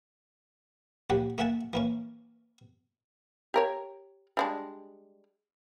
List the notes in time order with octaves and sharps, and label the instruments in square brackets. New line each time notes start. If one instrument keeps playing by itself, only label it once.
[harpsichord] A#1 C#3 G4 F#5
A3 A#3 E5 F#5 G#5 A5
E3 A#3 C#4
[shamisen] G4 A#4 C#5
G3 G#3 D4